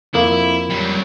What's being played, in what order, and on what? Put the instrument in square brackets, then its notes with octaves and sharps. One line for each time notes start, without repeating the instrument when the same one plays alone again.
[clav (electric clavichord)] F2 A#3 [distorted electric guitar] E4
[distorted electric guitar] F#3 G3